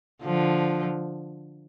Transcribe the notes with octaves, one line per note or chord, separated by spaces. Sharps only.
D3 F3